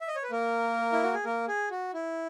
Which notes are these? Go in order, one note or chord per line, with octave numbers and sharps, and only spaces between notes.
E5
D#5
C#5
B4
A#3 A#4
E4
F#4
G#4
A#3 A#4
G#4
F#4
E4